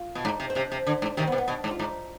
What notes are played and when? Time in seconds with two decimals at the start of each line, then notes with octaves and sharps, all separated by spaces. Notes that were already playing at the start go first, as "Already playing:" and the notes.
Already playing: F4
0.15 B2
0.25 G#2 D#4
0.40 C3
0.50 C4
0.55 C3 D4
0.72 C3
0.87 D3
1.02 G#2
1.17 C3 D#3 C4
1.27 B3
1.32 C3
1.38 B3
1.48 B2 D4
1.64 G#2
1.71 F4
1.79 G#2 D#4